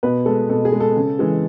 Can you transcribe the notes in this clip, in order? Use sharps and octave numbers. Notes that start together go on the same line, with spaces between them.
B2 B4
G#3 A4
B2 A4
G#4
G#3
A4
C#3
E3 G#3